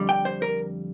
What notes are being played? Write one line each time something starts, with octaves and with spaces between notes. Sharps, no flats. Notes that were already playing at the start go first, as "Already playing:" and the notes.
Already playing: F2 D3 G3
G5
C5
A#4